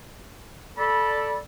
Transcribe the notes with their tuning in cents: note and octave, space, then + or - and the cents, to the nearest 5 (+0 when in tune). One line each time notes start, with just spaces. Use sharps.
A4 +0 D5 +0 B5 -20